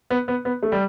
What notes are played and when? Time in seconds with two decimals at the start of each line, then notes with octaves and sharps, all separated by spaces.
0.10 B3
0.28 B3
0.45 B3
0.63 A3
0.72 G3